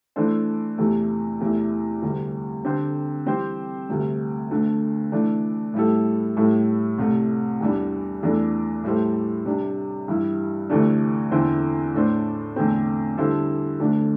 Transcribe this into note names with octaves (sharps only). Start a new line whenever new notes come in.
E3 A3 D4 A4 C5
E2 C3 E3 A3
E2 C3 A3 E4
D2 C3 G3
D3 C4 G4 C5
E3 G3 C4 G4 C5
D2 C3 G3
D2 D3 A3
E3 A3 D4
A2 G3 E4 A4
A2 G3 E4 A4
C2 C3 A3
E2 E3 G3 D4
E2 E3 A3 D4 A4
A2 G3 E4 A4 C5
C3 G3 D4 G4
G2 E3 G3 E4
D2 C3 E3 A3 D4
E2 D3 C4 E4 C5
A2 A3 D4 A4 C5
E2 D3 A3 C4
D3 G3 E4 A4 C5
D2 D3 A3 D4